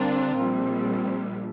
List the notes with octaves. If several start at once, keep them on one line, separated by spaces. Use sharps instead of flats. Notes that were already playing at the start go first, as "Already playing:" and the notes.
Already playing: D3 G3 C4 D4 F4 A#4
A#1 A#2 G3